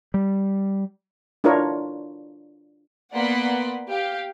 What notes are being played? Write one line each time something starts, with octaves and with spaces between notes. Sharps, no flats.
G3
D4 E4 F4 A#4 C#5
A#3 B3 D5 F#5 B5 C6
G4 F5